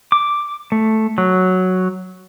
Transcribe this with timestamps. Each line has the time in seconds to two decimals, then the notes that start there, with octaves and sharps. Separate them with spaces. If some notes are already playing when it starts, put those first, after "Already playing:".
0.12 D6
0.72 A3
1.18 F#3